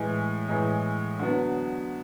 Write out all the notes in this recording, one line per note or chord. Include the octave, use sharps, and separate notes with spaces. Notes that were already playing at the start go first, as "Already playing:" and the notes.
Already playing: A2 E3 G#3
A2 E3 G#3
D3 F#3 B3